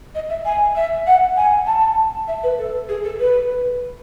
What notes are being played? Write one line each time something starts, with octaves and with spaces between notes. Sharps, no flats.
D#5
E5
G#5
E5
F#5
G#5
A5
E5
B4
A4
G#4
A4
B4